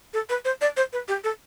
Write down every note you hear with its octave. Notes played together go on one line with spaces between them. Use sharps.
A4
B4
C5
D5
C5
B4
G4
A4